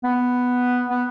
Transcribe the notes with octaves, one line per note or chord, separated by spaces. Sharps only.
B3
B3